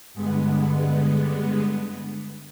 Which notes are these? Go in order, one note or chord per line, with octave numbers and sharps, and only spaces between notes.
G2 D3 G#3 B3